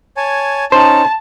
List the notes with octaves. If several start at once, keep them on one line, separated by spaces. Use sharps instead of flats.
C#5 G#5 A5
C#4 D#4 C5 A5